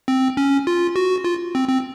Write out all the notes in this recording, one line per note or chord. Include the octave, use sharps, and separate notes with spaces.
C4
C#4
F4
F#4
F4
C4
C4